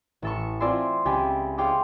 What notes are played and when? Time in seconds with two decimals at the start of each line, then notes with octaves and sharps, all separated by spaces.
0.22 A1 A4 C#6
0.60 C4 F4 D5 E5 G#5 C6
1.05 C#2 G4 G5 G#5 B5 D6
1.58 G#4 C#5 F5 G5 C6 D6